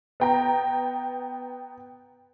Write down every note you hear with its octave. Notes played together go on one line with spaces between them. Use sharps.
B3 G5 A#5